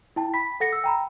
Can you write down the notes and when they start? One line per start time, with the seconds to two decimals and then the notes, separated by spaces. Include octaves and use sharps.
0.16 E4 G5 A5
0.34 B5 B6
0.60 A4 F#5 A#6 C#7
0.73 E6
0.84 G5 A#5 B5